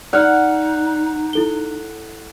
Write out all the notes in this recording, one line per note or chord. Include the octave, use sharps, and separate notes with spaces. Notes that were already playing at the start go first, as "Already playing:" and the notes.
D#4 D5 F#5 F6
E4 A4 G7